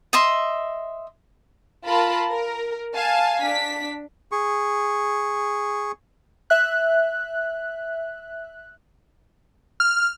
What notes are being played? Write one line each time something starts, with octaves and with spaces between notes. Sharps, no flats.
D#5 E5 C6
F4 A#4 A5 B5
A#4
F5 G#5 A5
D4 B6
G#4 C#6
E5 F#6
F6